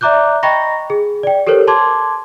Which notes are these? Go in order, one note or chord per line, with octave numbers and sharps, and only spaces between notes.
D5 E5 A#5 D6 F#6 G6
D#5 G5 A#5 B5 C#6 A#6
G#4
D5 G5
G4 A4 A#4 C5 C#5
A5 C6 D6 G#6